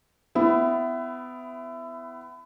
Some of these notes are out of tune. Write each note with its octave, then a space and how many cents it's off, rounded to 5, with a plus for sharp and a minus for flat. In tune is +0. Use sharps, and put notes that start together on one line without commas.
B3 +30 E4 +15